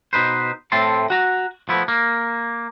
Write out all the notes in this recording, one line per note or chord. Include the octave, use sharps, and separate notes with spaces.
B2 D#4 B4 C5
A2 A3 C4 A4 A5 C6
F#4 A#5
F3 A3 B3 E4
A#3